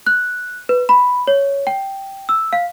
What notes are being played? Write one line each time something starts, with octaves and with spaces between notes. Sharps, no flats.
F#6
B4
B5
C#5
G5
E6
F5